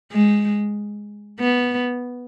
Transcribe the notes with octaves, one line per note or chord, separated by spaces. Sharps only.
G#3
B3